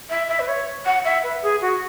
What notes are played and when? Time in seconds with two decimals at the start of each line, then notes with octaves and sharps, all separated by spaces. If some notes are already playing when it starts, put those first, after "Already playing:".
0.10 E5
0.29 E5
0.39 B4
0.48 C#5
0.86 F#5
1.05 E5
1.23 B4
1.42 G#4
1.62 F#4